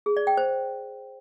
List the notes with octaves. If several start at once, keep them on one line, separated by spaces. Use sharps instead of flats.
G#4
D5
G5
C5